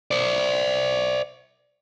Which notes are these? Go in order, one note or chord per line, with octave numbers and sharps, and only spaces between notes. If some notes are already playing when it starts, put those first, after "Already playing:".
C5 D5